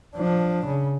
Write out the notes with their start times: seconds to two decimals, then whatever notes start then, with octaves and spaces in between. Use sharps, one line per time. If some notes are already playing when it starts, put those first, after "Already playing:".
0.15 F3 D4
0.66 C#3